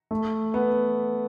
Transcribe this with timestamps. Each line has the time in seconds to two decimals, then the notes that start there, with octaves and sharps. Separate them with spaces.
0.11 A3
0.54 B3